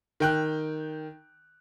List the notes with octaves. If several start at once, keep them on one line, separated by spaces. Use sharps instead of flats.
D#3 G5 F#6